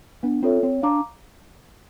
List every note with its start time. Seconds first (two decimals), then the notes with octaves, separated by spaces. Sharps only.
0.23 B3 D4
0.43 C4 F4 A4 C#5 E5
0.63 C4 C#5
0.82 D4 F5 A#5 D6